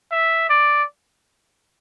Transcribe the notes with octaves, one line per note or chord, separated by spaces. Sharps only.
E5
D5